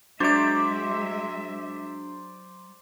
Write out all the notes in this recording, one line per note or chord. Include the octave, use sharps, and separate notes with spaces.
F#3 G#3 D4 C5 D5 E5 D6